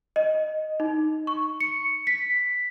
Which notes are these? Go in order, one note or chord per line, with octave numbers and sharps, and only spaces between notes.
D#5
D#4
C#6
C#7
B6